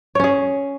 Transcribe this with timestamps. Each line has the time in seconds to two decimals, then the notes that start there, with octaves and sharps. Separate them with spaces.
0.15 C#5
0.20 C#4
0.24 G#4